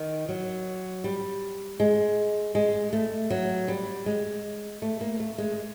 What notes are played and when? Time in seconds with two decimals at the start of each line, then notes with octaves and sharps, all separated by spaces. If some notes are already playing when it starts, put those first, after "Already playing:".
Already playing: D#3
0.29 F#3
1.04 G3
1.80 G#3
2.55 G#3
2.93 A3
3.30 F#3
3.68 G3
4.06 G#3
4.82 A3
5.01 A#3
5.20 A3
5.38 G#3